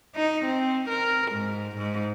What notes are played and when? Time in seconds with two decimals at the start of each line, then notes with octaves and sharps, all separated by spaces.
0.16 D#4
0.45 C4
0.90 A#4
1.32 G#2
1.77 G#2